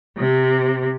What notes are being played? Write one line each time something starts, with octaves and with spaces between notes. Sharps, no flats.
C3